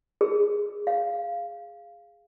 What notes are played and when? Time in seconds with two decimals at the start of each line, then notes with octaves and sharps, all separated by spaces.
0.21 G#4
0.87 F5